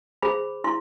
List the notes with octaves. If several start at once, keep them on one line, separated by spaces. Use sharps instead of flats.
G#4 C5 B5
E4 C6